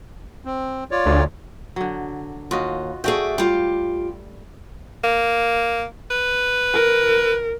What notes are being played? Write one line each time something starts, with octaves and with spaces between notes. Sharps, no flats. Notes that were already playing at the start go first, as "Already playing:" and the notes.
C4
F4 C#5 D5
D2
D3 F#3
D#2 F4 F#4 D#5
A3 F#4 G#4 D5 E5 G5
G3 F4 G4
A#3
B4
A#4